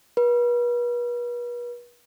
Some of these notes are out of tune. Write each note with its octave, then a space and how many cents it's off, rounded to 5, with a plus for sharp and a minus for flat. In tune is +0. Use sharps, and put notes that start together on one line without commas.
B4 -40